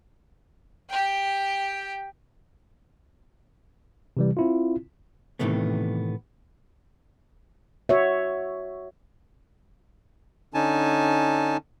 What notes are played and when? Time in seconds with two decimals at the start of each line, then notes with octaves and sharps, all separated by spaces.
0.89 G4 G5
4.17 C3 E3 G3
4.37 C4 E4 F4
5.39 A2 C3 D#3 E3 A3 B3
7.89 F#4 C#5 E5
10.54 D3 C#4 D#4 G#5 A5